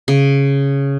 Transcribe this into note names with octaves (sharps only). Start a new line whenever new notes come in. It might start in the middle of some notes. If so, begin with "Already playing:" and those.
C#3